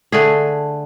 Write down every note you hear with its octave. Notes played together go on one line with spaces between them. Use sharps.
D3 A3 G#4